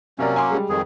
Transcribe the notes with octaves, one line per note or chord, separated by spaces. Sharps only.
C3 F#3 A#3 C#4 A#4 D5
G#5 C6 D6
G3 G#3
F2 D#3 G#4